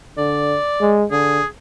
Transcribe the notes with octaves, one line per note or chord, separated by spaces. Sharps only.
D3 D5
G#3
D3 G#4